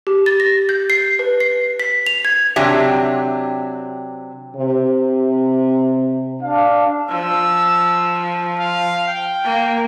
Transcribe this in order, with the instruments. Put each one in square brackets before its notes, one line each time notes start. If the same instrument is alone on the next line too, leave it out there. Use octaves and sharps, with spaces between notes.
[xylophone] G4
A6
A#6
G6
C7
B4
C7
B6
F7
G#6
[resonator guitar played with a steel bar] C3 F#3 C4 D4 G4 E5
[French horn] C3
[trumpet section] D4 F5
[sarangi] F3 [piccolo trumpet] E6
[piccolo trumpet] F5
G5
[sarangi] A#3